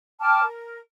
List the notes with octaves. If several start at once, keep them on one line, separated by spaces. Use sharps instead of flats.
G5 A5 D6 F6
A#4